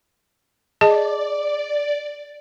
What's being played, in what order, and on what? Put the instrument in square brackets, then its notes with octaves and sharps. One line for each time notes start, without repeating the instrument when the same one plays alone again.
[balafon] G#4 D#5 A5 [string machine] D5